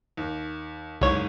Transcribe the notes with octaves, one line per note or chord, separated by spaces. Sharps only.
D#2
F#1 C2 G#2 C#5